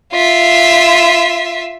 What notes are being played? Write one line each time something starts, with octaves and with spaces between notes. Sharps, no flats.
F4 E5